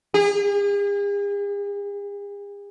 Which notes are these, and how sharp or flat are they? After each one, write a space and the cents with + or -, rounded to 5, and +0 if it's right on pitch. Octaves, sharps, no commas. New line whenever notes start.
G#4 -45